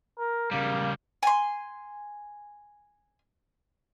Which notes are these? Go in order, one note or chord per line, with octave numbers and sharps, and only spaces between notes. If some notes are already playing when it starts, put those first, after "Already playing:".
A#4
C#3 G3 A#3
G#5 C6